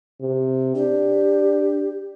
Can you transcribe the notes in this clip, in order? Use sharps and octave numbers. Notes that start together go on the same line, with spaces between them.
C3
D4 G4